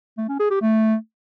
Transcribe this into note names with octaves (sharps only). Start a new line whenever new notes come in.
A3
C#4
G#4
G4
A3